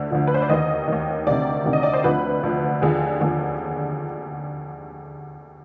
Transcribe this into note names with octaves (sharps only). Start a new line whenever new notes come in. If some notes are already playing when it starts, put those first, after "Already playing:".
Already playing: D2 D3
D2 D3 F3
B4
C5
D5
D#2 D#3 D#5
D#2 D#3
D2 C3 D#3 D5
D2 C3 D#3
D#5
D5
C5
D2 D3 F3 B4
D2 D3 F3
D#2 D3 F3 G#4
D#2 D3 F3